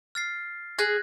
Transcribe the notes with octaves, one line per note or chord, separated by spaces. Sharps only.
F6 A6 C7
G#4 F#6 G#6 A#6